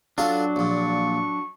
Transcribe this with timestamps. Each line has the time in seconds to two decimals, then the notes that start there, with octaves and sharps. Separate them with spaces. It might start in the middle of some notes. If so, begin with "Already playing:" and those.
0.18 F#3 D4 F4 F#4 A4
0.56 A#1 A#2 C#6